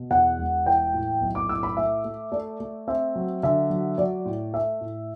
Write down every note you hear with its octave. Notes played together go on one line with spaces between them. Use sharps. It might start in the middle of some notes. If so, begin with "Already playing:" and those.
Already playing: B2
E2 F#5
E1
E3 G5
A2
B1
D6
A2 E6
B5
A3 E5
A3
A3 D5
A3
C4 E5
F#3
D3 E5
F#3
F#3 D5
A2
A3 E5
A2